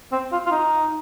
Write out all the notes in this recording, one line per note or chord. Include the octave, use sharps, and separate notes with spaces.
C4
F4
F4
D#4